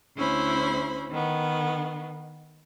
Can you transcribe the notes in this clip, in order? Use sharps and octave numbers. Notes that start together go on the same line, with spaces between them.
D2 C#4 E4 C5 B5
D#3 B3